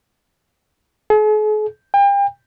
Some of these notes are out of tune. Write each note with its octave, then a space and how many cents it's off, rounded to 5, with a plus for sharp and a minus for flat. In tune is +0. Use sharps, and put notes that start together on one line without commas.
G#4 +45
G5 +35